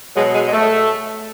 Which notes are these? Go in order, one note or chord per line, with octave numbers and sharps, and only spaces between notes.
B2 F#3 G#3
G#3
G#3
A3